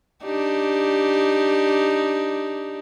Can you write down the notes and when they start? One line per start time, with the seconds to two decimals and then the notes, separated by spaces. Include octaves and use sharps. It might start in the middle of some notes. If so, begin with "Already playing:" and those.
0.24 D4 D#4 G4